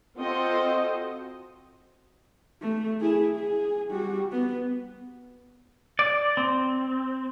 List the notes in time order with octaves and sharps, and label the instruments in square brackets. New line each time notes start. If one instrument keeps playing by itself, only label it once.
[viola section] C4 F4 F#4 A4 C5 D#5
[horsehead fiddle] A3
E4 G#4
G#4
G3 F#4
B3
[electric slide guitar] D5
C4